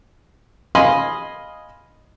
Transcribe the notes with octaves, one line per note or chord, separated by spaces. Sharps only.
D#5 F5 G#5 B5 C6